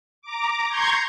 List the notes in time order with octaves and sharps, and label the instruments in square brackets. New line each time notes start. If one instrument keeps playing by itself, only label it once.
[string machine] A#5 D6
A#5 C6 C#6 G6 G#6